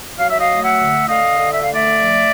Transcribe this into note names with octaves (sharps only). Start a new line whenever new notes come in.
F#3 F5
E5
D#5 F5
A3
E5 F#5
D3
D3 D#5 F5
D3
E5
A3 F5
D5 E5
F3